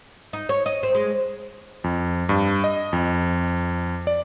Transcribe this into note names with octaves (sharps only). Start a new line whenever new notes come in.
D#4
C#5
D#5
C4
G#3
F2
G2
D#5
F2
D5